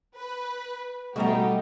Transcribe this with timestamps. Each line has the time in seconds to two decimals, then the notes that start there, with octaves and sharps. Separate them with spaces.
0.17 B4
1.16 B2 G3 A3 B3 D#4 F#4 G4 A#5